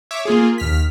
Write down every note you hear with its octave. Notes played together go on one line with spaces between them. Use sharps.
C#5 E5 D6
A#3 F4 G#4
D#2 F6 B6